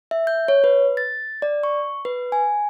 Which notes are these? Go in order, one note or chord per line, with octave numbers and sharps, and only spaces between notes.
E5
G6
C#5
B4
A6
D5
C#6
B4
G#5